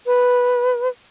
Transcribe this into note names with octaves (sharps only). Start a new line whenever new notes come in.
B4